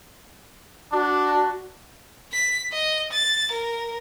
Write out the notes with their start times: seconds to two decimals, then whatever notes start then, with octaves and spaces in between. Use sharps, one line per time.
0.93 D4 F#4
2.32 B6
2.73 D#5
3.13 A6
3.51 A#4